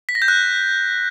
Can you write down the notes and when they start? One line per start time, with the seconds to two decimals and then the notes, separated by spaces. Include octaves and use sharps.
0.09 B6
0.15 A#6
0.22 G6
0.28 F#6